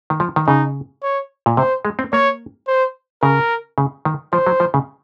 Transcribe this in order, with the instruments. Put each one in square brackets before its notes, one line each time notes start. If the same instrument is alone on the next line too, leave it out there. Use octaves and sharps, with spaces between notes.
[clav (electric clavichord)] D#3
F3
D#3
[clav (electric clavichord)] C#3 [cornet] D#4
[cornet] C#5
[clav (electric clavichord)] A#2
[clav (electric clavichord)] C3 [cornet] C5
[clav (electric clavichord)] G#3
C4
[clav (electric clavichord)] A#3 [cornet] C#5
[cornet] C5
[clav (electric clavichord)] C#3 [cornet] A#4
[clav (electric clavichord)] C#3
D#3
[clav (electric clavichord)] F3 [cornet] C5
[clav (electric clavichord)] F#3
F3
C#3